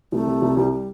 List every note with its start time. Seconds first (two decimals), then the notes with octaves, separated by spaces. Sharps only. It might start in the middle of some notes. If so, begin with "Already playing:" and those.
0.12 C2 A3
0.27 C3
0.42 C2
0.57 C2 G3
0.72 G3